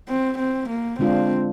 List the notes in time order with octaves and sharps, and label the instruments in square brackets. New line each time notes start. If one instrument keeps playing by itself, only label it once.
[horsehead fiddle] C4
C4
A#3
[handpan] D3 G#3 D4 F4 [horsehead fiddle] C4